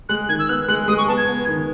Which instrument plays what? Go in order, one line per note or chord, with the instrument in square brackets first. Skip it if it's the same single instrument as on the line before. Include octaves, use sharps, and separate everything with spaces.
[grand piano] G#3 [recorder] F#6
[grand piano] D#3 [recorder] G#6
[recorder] E6
[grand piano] B3 [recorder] F#6
[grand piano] G#3 [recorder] F#6
[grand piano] G#3 [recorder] D#6
[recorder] C#6
[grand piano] B3 [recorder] A5
[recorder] G#6
[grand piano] B3
D#3